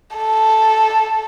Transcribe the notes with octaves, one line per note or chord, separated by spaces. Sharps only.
A4